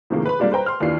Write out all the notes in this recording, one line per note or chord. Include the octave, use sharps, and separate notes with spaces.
A2 C3 D#3 F3 G#3 A#3
B4 B5
G3 G#3 A#3 D4 F4 G4
B4 C5 G5 A#5
C6 F6
D#2 E3 A#3 D4 F4 C7